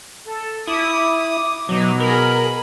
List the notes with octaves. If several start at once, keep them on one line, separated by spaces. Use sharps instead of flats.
A4
E4 D6 D#6
B2 F#3 D#4
G#4 A#4 B5